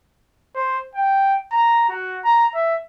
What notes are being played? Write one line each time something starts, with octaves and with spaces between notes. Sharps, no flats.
C5
G5
A#5
F#4
A#5
E5